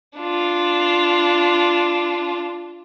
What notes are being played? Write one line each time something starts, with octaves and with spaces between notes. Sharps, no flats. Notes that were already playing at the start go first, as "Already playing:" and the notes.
D4 F4